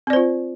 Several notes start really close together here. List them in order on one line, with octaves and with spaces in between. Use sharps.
C4 D5 C5 F4